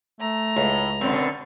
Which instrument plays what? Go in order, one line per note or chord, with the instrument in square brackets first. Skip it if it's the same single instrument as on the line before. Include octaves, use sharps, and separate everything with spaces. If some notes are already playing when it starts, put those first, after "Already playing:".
[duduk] A3 [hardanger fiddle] A#5
[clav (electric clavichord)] C#2 [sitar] A2
[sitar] F#2 B2 D3 [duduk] C4